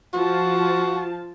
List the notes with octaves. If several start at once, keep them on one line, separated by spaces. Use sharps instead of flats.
F3 F4 F#4 A5